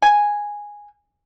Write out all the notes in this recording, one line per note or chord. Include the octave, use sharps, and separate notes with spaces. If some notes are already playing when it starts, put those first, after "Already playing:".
G#5